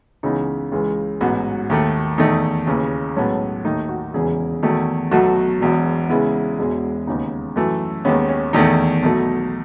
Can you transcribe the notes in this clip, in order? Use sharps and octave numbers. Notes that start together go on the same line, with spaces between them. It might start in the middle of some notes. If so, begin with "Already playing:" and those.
C#2 C#3 E3 B3 D#4
C#2 C#3 E3 G#3
A1 G#2 F#3 B3 F#4
D#2 D#3 A3
E2 D#3 A3 D#4
D#2 C#3 E3
B1 A2 G#3 B3 C#4
D#2 D#3 A3 D#4
F#4
E1 E2 C#3 E3 G#4
E2 D#3 F#3 A3
B1 B2 F#3 A3 F#4
E1 E2 B2
E2 C#3 G#3 B3 E4
E1 E2 B2 G#3
D#2 C#3 G#3 B3 D#4
F#2 E3 A3
D#2 D#3 G#3 B3 C#4
C#4
E2 D#3 A3 D#4
B1 B2 A3